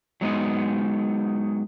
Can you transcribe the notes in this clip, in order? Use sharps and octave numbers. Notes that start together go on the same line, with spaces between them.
F#3 G#3 B3 D#4